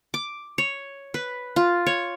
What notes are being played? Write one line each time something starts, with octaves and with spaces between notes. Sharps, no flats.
D6
C#5
B4
F4
C#5